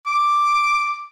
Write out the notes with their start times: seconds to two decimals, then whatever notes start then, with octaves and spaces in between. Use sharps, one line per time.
0.07 D6